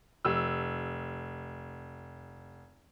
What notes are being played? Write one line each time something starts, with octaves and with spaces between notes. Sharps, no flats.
F1 E6